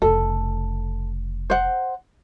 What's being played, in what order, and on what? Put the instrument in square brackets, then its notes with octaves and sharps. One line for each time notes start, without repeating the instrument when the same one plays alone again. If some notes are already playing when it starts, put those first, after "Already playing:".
[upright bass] F1 C#3 [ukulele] A4
[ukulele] C5 F#5